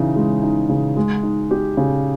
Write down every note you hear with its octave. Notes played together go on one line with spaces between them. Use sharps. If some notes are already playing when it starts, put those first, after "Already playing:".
Already playing: C#3 E3 D#4
G#3
D#4
C#3
G#3
D#4
G4
C#3